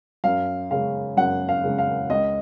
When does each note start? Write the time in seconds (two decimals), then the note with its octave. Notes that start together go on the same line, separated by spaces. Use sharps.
0.24 F#2 F5
0.71 C#3 G#3 F5
1.17 F#2 F#5
1.49 F5
1.64 C#3 G#3
1.78 F5
2.10 C#2 D#5